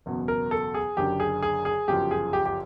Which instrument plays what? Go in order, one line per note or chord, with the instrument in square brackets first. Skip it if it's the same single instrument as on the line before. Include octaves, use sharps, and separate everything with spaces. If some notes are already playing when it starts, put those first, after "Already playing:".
[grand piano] F#1 E2 B2
A#4
A4
G#4
F#1 F#2 D3 G4
G#4
G#4
G#4
G1 F#2 C#3 F3 G4
G#4
G4
G4